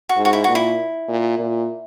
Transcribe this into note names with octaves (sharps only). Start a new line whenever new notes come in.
F#4
G#2
F#4
E4
A#2 F#4
E4
A#2
A#2